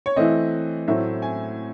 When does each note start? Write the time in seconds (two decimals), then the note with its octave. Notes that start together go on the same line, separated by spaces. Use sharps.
0.06 C#5
0.16 E3 A3 C4 D#5
0.88 A2 F#3 A3 C4 E5
1.22 G#5